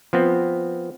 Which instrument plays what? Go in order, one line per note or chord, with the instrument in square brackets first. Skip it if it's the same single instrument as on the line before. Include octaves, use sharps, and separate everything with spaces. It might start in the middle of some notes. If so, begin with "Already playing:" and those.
[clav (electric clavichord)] F3 B3 C4